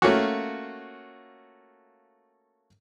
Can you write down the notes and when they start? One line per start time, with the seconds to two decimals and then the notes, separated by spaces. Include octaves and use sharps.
0.02 A3 A#3 C#4 F4 F#4